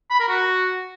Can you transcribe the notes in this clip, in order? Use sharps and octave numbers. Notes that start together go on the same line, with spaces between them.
B5
A#4
F#4